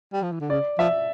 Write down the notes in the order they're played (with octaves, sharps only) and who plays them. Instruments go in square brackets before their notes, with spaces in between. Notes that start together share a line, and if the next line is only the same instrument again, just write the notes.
[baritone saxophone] G3
F3
E3
D3
[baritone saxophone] C#3 [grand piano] D5
[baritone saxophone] F3 [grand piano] E5